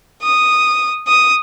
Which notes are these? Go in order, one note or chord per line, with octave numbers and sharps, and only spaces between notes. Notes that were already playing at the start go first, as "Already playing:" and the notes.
D#6
D#6